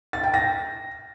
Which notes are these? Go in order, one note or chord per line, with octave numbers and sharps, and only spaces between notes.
A6
G5
A#6